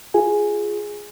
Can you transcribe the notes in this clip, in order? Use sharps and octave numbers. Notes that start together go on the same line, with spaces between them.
F4 G#4 G#5